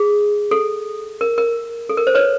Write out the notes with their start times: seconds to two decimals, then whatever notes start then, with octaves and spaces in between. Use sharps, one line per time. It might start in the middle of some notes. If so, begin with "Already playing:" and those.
Already playing: G#4
0.51 A4
1.21 A#4
1.38 A#4
1.89 A4
1.97 A#4
2.07 C5
2.15 B4 C#5